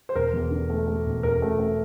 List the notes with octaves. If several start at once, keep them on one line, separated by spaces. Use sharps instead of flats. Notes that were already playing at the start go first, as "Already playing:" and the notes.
C5
E1 A#4
E2
D3
A3
A3
E1
E1 A#4
A3
A3